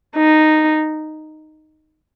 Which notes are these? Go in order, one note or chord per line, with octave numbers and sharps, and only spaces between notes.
D#4